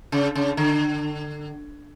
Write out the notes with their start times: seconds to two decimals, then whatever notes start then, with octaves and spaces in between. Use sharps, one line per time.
0.12 C#3
0.35 C#3
0.57 D3